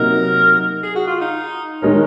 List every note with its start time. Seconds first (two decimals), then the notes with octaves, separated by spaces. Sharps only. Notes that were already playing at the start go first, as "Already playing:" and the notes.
Already playing: C3 F#3 A#3 D#4 A#4
0.83 G#4
0.95 F#4
1.07 F4
1.21 D#4
1.82 D#3 G#3 C#4 D#4 A#4